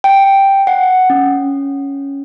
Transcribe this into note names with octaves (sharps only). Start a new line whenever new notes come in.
G5
F#5
C#4